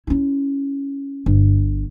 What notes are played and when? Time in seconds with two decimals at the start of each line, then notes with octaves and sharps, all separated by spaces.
0.07 C#4 E4
1.26 G1